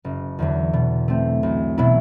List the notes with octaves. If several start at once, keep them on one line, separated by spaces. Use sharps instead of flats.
F#1
E2 D3 F#3
B2
A3 C4
B1
B2 F#3 B3 E4